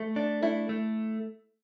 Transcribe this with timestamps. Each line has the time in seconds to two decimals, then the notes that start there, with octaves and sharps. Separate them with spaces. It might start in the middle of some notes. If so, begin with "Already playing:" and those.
Already playing: A3
0.16 D4
0.43 A3 E4
0.69 A3